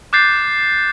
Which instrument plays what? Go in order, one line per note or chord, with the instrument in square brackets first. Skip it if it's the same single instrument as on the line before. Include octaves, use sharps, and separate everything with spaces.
[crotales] D6 F#6 G6 A6 C7